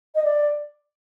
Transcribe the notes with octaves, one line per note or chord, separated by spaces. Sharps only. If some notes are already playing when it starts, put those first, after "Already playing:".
D#5
D5